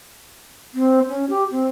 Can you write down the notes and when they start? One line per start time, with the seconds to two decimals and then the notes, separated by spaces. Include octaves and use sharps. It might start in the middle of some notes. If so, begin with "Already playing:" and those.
0.74 C4
1.09 C#4
1.30 G4
1.51 C4